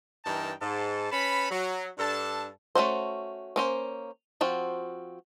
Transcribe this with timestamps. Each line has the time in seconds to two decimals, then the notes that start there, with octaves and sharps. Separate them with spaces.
0.25 G2 E3 D#4 A#4 G5 A5
0.61 G#2 A5
1.12 C#4 B4 A5 B5
1.51 F#3
1.99 G2 D4 A4 A5
2.75 A3 C#4 F#4 C5
3.56 A#3 C#4 C5
4.41 F3 C4 F#4